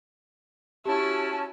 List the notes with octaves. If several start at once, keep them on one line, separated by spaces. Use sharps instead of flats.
C#4 E4 F#4 G4 A5